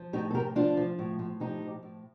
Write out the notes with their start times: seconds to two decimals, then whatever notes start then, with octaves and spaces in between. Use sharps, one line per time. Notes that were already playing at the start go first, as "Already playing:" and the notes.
Already playing: F3
0.13 A2 D#4 G4
0.31 A4
0.35 A2 G4 A#4
0.56 F3 D4 F4
0.77 F3
0.99 A2
1.19 A2
1.40 F3 D#4 G4
1.62 F3
1.83 A2